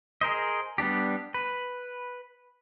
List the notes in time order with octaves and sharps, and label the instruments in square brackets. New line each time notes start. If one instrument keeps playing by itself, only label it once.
[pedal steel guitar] G#4 A#4 C5 D#5
G3 B3 D4 G4
B4